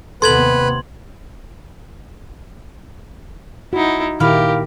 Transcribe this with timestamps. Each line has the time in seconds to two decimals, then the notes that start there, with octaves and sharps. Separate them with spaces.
0.22 D#2 C3 B3 A4 B4 C6 G#6 F#7
3.73 D#4 E4 F#4
4.20 A#2 D#3 E4 G4 A#4 F5 B5